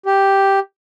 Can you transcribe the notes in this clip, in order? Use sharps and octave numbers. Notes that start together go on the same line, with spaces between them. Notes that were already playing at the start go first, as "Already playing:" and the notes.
G4